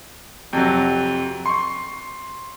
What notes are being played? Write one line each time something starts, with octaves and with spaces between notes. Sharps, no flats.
F2 C3 F#3
C6 C#6